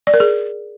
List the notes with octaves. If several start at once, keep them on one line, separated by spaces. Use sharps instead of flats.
D5
A#4
G#4